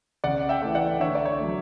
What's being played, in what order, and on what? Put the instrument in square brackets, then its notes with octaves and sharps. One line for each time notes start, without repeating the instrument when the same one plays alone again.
[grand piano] C#3 D5 F#5
E5 G5
E3 A3
D5 F#5
D3 C#5 E5
D5
C#5
F#3 A3